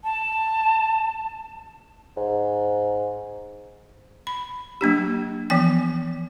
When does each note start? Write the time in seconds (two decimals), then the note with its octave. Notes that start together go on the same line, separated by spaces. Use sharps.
0.04 A5
2.17 G#2
4.27 B5
4.81 F#3 A#3 D4 G4
5.50 E3 F3 B3 G5